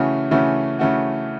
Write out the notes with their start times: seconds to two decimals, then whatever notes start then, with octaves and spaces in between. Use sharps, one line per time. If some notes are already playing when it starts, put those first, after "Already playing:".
Already playing: C#3 E3 A3 C#4 F#4
0.31 C#3 E3 A3 C#4 F#4
0.79 C#3 E3 A3 C#4 F#4